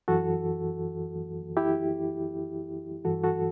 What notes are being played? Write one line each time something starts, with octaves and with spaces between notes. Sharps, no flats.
F#2 E3 F#4 A4
E4 G4
G2 E3 F#4 A4
F#4 A4